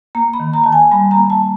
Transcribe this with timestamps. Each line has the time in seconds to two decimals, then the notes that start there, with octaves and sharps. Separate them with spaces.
0.15 A#3 A#5
0.33 B5
0.40 D#3
0.53 A#5
0.64 D#3 A5
0.72 G#5
0.91 G3 B5
1.11 A#5
1.17 A#3
1.30 A5